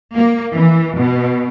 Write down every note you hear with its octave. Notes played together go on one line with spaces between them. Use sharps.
A#3
E3
B2